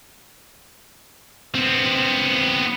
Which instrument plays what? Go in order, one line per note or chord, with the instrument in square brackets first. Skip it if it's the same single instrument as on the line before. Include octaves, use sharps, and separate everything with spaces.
[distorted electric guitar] B3 C4